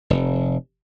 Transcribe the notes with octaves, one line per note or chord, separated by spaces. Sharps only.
F1